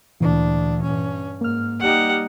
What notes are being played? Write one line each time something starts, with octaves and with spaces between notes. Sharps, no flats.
D2 A#2 E3 D4
G2 C#4
G#2 A#3 F6
G3 D#4 G4 F#5